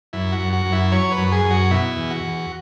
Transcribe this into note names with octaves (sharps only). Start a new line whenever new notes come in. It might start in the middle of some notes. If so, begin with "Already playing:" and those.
F#2 E4
F#4
F#2
F#4
F#2
E4
F#3 C#5
B4
F#2
G#4
F#2
F#4
B2 E4
E2
F#4
E2